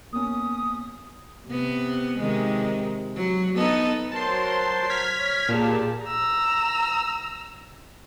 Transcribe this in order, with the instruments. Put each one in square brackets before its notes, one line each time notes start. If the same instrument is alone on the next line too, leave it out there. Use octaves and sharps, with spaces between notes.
[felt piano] A#3 B3 C#4 [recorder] D#6
[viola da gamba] C3 B3
C3 D#3 G#3
F#3
B3 D#4 A4
[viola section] F#3 A#4 C5 [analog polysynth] A5 C6
[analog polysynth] F6 G#6 B6
[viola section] C#5
[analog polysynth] A#2 [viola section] G4 G#4 A5
[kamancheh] A#5 E6